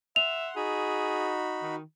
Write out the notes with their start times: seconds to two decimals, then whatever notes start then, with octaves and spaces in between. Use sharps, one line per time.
0.16 E5 F#5 C6 F7
0.56 D#4 F#4 G#4 B5
1.62 D#3